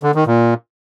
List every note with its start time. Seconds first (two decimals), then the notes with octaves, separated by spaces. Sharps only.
0.03 D3
0.15 D#3
0.27 A#2